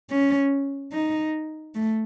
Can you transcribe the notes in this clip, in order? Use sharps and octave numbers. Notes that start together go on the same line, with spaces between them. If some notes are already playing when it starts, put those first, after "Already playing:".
C#4
D#4
A3